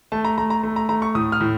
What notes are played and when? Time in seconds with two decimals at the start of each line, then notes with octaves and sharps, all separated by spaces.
0.12 A3 A5
0.25 A#5
0.38 A3 A#5
0.50 A#5
0.63 A3
0.76 A#5
0.89 A3 A#5
1.02 C#6
1.15 A2 D#6
1.32 F6
1.40 A2